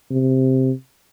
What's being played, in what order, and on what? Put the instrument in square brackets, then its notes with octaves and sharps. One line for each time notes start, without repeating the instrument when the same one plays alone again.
[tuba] C3